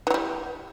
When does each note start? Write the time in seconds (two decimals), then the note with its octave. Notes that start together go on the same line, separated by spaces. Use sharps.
0.07 E3
0.10 F#3
0.14 G3